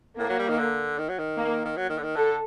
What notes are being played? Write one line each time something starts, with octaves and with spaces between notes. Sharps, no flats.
A2 A#3
F#3
G3
D#3
D3
D#3
F#3
D#3
A#3
D#3
F#3
D#3
D3
D#3
D3 A4